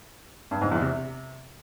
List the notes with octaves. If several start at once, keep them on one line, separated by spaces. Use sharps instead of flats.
G2
G#2
E2
C3